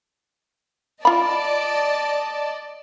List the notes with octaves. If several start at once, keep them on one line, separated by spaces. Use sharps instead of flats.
F4 D5 D#5 A5 B5